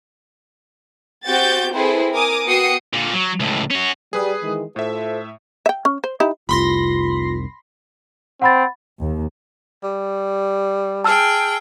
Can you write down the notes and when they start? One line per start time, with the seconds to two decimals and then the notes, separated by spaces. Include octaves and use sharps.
1.26 C4 F#4 G4 G6 A6
1.72 C4 E4 G#4 A4 B4 C5
2.12 A#4 G#5 D6 D#6
2.47 B3 F#4 G5 D#6 C7 C#7
2.93 A#2 D3
3.13 F#3
3.40 C#2 A2
3.70 C#4 F#4
4.13 G3 G#4 B4 D#6
4.43 D#3 E3 G#3
4.76 A2 F4 A4 C5 E5
5.66 E5 G5
5.85 C#4
6.04 C5
6.20 D#4 E4 G4
6.49 F1 C2 F4 B5 C6 A#6
8.42 C4 F#5 B5 A6
9.00 D#2
9.83 G3
11.04 G#4 G5 A5 E6 F6